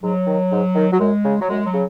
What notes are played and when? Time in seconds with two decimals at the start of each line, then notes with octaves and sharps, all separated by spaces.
0.01 G#2 F#3
0.27 D#3
0.51 G#2
0.75 D#3
0.92 F#3
1.00 F#2 G#3
1.24 C#3
1.41 F#3
1.49 F#2 G#3
1.65 F#3
1.73 C#3